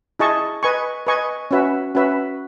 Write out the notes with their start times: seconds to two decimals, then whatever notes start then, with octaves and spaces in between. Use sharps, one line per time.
0.19 E4 G#4 D#5 A5 C#6
0.63 B4 D#5 G#5 C#6
1.07 B4 D#5 G#5 C#6
1.51 C#4 F#4 B4 E5
1.95 C#4 F#4 B4 E5